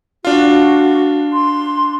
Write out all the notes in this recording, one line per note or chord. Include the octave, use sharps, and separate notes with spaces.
D4 F4 F#4
C6